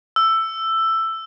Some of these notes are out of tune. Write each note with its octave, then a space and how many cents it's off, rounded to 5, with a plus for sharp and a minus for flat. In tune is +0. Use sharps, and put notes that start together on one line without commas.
E6 +10